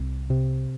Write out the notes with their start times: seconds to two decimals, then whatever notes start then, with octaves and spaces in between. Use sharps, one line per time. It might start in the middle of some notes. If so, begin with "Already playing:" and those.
Already playing: C2 C3
0.30 C3